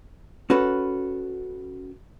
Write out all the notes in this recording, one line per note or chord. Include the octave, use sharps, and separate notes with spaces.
C#4 F#4 A4 B4